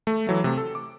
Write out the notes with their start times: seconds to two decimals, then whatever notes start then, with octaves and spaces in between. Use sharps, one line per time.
0.07 A3
0.27 E3 F#3 A3
0.44 C3 A3
0.57 A4
0.75 D6